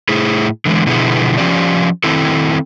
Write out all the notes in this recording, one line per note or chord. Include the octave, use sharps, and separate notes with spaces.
A2 A3 E4 G#4
D3 E3 G#3
B2 D3 F3 B3 E4 G#4
F3 C#4 F4 G4 D5
D#3 C4 E4 A4